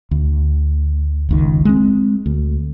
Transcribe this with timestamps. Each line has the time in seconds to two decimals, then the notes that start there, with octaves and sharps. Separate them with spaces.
0.11 D2
1.29 F#1 C#2 D#3
1.65 G#3 C4
2.26 D2